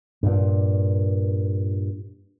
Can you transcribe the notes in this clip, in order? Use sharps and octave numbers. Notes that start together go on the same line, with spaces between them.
G2 A#2